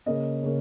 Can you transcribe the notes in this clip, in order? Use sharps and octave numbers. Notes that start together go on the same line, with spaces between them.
C#3 A#3 C#4 D#5
C#3 A#3 C#4